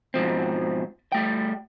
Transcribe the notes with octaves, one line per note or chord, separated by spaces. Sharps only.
G#2 B2 F3 C4
G3 A3 G5